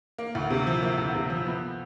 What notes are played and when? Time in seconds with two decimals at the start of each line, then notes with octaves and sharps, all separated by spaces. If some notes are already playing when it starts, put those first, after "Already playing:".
0.18 A#3
0.35 D2
0.50 C3
0.67 F3
0.82 A#3
0.98 D2
1.14 C3
1.30 F3
1.46 B3